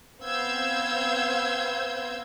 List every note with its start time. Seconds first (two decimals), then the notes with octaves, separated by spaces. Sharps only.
0.22 B3 C4 F5 E6 G6 G#6